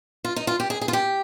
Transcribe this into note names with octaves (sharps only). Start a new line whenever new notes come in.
F4
D#4
F4
G4
G#4
G#4
F4
G4